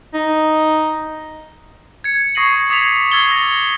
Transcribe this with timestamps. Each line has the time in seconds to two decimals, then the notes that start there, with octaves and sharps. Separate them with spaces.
0.14 D#4
2.04 G#6 C#7
2.35 C#6 D#6 A#6 C7 D#7 F#7
2.70 D6 D#6 G#6 A6 B6 F7
3.12 E6 G#6 A6 C7 G7
3.30 A6 A#6 C#7